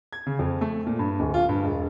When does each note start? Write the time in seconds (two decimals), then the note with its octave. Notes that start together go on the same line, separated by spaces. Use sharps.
0.13 G#6
0.27 C#3
0.39 F2
0.61 A3
0.87 A#2
0.99 G2
1.20 D1
1.34 F4
1.49 G2
1.64 E1